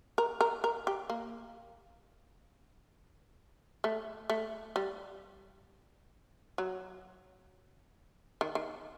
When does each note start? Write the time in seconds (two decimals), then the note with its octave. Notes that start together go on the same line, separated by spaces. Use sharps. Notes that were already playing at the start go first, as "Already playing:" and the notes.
0.18 A#4
0.41 A#4
0.64 A#4
0.87 G4
1.10 A#3
3.84 A3
4.30 A3
4.76 G3
6.58 F#3
8.41 D#3
8.55 D#3